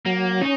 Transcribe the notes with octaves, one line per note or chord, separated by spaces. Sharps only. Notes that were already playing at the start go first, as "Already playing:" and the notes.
F#3 A#3
C#4 D#4